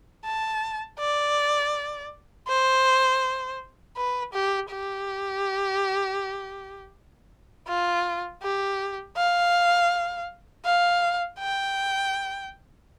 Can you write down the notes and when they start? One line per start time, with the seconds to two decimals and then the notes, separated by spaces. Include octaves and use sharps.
0.25 A5
0.99 D5
2.48 C5
3.96 B4
4.33 G4
4.71 G4
7.68 F4
8.42 G4
9.16 F5
10.65 F5
11.39 G5